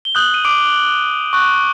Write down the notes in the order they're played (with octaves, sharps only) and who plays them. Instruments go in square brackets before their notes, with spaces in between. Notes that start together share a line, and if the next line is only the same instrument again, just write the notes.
[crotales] G7
D#6 F#6 G6 F#7
D#7
D6 D7
C#6 F#6